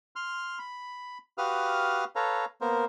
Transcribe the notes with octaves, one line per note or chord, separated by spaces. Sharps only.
C6 F6
B5
F#4 G4 B4 F5 D#6 F6
A4 B4 C#5 F5 A#5
A#3 B3 A#4 C5